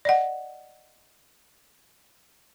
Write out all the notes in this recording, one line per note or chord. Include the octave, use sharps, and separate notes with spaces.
D5 D#5 F#5